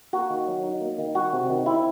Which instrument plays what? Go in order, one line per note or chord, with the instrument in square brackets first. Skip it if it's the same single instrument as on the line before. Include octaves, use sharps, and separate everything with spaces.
[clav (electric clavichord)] A#3 F#4
D#3
F#3
D#4
A#3
D#3
G3 F#4
C3
D#3
C4 E4